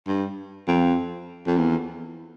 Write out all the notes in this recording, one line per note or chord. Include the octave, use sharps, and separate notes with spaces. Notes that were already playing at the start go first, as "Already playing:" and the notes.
G2
F2
F2
E2